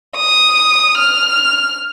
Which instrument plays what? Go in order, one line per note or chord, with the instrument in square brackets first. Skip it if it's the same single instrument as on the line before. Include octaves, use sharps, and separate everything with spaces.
[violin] D#6
F6